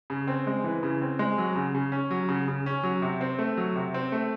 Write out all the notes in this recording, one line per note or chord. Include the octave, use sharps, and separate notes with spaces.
C#3
C4
G#3
E3
C#3
C4
G#3
F#3
C#3
C#3
C#4
F#3
C#3
C#3
C#4
F#3
C3
C4
A3
F#3
C3
C4
A3